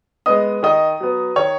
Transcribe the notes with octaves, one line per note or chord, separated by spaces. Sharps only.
G#3 B3 D#5 D#6
D#3 D#5 D#6
F#3 B3
D#3 C#5 C#6